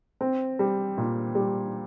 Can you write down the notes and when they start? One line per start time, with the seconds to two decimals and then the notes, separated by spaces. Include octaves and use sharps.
0.21 C4
0.59 G3
0.98 A#2
1.35 G3